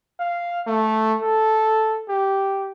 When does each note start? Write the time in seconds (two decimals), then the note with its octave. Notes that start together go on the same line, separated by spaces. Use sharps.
0.19 F5
0.67 A3
1.22 A4
2.09 G4